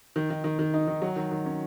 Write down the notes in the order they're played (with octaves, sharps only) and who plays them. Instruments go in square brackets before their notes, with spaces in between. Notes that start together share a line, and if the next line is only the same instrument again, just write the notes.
[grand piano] D#3
D#3
D#3
D#3
D#4
D#3
F#3
D#3
D#3
C#4